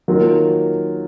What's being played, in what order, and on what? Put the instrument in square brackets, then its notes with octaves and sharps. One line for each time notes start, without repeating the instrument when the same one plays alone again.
[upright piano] D#3 F#3 A#3 F4